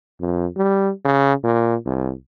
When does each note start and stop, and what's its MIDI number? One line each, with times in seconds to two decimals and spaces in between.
0.21 0.46 41
0.56 0.90 55
1.04 1.33 49
1.44 1.75 46
1.85 2.12 36